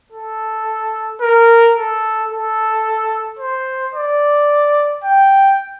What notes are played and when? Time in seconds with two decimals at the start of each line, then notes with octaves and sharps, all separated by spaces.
0.12 A4
1.21 A#4
1.76 A4
2.31 A4
3.39 C5
3.94 D5
5.04 G5